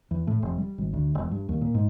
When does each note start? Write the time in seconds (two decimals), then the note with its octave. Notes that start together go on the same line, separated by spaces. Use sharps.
0.11 E2
0.27 A2
0.42 F1
0.58 G3
0.78 G#1
0.93 D2
1.15 E1
1.31 G2
1.49 D#2
1.61 A#2
1.74 G#2